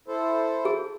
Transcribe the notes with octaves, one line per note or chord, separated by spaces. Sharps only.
E4 A4 C5
G#4